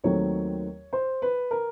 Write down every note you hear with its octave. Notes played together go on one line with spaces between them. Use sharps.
D#2 D#3 F#3 A3 C4 C#5
C5
B4
A#4